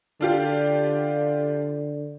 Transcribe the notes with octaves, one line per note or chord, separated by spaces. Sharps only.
D3 D4 F4 G4